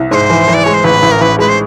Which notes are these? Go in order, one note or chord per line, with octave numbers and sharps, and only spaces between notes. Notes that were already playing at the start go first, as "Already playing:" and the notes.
Already playing: C2
G#2 C5 C#5
E3
E3
D5
G#3 C#5
C5
A1 B4
A1
A#4
A1 B4
G#3 B4
C5